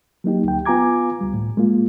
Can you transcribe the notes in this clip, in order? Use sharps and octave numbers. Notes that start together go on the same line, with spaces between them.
F#3 A#3 D#4 G4
D2 G5
B3 F4 G#5 A#5 D6 G#6
C#2 G3
A2
G#3 A#3 F4